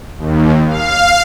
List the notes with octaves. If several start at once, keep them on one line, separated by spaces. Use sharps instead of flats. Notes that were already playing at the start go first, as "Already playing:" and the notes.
D#2
F5